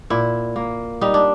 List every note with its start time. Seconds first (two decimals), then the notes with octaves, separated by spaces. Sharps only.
0.10 A#2 E4
0.56 A#3
1.01 G3 D#4
1.14 D4